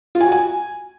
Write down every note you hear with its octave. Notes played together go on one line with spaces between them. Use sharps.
F4
G#5
F#4
G#5